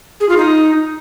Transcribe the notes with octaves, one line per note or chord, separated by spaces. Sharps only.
G#4
F4
D#4